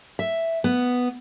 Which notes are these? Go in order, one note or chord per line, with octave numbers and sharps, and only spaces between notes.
E5
B3